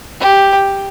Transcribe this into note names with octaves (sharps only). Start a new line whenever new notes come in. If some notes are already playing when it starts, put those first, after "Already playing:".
G4